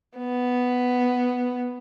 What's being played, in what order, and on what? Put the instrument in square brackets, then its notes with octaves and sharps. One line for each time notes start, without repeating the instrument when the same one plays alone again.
[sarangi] B3